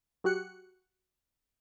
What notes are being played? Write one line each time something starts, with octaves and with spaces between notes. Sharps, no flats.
F#3 F#4 G4 F#6 C#7